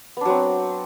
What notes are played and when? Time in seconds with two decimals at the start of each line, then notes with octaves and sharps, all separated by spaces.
0.17 B3
0.21 D4
0.25 F#3
0.30 C4